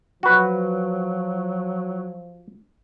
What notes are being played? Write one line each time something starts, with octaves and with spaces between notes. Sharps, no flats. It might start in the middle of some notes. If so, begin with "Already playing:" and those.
F3 F#3 F#4 B4